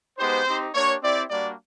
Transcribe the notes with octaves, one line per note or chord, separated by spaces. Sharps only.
G#3 B3 D#4 G4 C5
C4 D#4 G4
A#3 D4 G4 C#5
C4 E4 G4 D5
G3 A#3 D4 F#4 D5